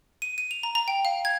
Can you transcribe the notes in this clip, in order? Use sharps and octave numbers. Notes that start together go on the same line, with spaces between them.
D#7
D#7
F7
A#5
A#5
G5
F5
G#6